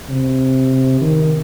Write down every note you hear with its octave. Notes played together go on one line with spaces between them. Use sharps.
C3
D#3